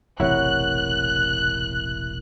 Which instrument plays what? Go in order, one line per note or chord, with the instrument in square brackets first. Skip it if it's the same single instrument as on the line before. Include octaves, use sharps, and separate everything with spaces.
[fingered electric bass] E1 A1 C3 [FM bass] E4 [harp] A#4 C#5 F#5 [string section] F#6